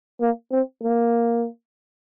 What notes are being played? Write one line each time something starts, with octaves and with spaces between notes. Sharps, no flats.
A#3
C4
A#3